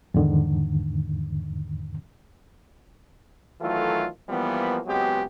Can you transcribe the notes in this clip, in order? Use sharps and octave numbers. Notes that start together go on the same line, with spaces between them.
E2 G#2 D3 D#3
D#3 E3 F#3 A3 F4 A4
E3 F3 G3 A#3 B3
C#2 F#3 G#3 B3 C4 G4